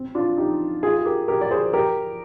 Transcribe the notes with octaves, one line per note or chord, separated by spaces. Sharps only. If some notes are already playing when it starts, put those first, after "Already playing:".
Already playing: C4
D4 F4
D#4 G4
F4 G#4
G#4
G4 A#4
G4 A#4
D5
G#4 C5
G4 A#4